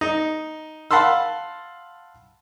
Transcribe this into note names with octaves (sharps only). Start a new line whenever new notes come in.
D#4
F5 F#5 A5 B5 C6 E6